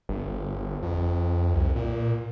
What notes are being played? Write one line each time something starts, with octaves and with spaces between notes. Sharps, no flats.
G1
F2
C2
A#2